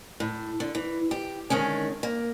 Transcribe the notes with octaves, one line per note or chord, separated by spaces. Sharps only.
A2
D3
E3
G4
D3 D#3 G#3 C#4
A#3